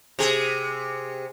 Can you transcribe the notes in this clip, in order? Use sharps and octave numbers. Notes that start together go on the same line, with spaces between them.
C3 G#4